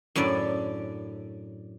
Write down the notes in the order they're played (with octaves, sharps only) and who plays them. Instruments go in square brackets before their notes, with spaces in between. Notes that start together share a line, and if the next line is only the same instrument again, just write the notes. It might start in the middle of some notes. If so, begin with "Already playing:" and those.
[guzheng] F#2 A2 D4 D5